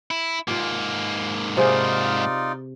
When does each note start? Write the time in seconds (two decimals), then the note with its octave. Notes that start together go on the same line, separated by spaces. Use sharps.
0.11 E4
0.48 G#2 A#3 F4 G4
1.57 C3 D#4 F4 G#4 D5